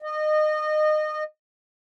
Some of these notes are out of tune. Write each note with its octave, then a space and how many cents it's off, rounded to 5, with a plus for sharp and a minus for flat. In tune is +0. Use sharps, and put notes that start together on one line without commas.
D#5 -25